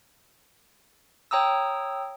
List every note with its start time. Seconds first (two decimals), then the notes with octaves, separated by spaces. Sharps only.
1.31 C#5 G5 A#5 D#6 E6